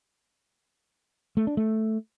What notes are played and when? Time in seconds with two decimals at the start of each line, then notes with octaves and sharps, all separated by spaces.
1.37 A3
1.47 D4
1.57 A3